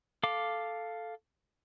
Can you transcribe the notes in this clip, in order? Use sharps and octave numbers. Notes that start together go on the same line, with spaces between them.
A4 F5 D6